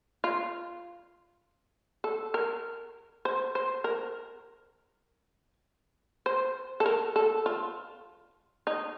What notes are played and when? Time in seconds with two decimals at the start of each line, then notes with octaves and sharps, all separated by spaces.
0.24 F4
2.04 A4
2.34 A#4
3.25 C5
3.55 C5
3.84 A#4
6.26 C5
6.80 A4
6.86 A#4
7.16 A4
7.46 F4
8.67 D#4